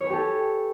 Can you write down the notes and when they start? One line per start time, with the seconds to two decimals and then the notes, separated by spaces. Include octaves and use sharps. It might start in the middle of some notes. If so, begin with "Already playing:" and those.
0.01 C#5
0.04 B4
0.07 G#5
0.10 G4
0.13 A4